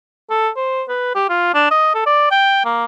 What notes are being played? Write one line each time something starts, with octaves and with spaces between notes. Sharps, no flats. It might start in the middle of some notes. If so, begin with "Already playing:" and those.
A4
C5
B4
G4
F4
D4
D#5
A4
D5
G5
A#3